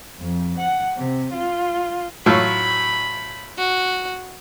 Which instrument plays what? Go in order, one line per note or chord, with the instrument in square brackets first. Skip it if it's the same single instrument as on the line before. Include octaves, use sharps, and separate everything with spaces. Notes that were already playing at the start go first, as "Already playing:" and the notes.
[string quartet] F2
F#5
C3
F4
[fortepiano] A2 F#3 F4 [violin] B5
[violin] F#4